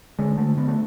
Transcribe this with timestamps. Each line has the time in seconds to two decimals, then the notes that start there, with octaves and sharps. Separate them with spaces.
0.19 D3 G#3
0.38 D3 A3
0.57 D3 B3
0.68 A3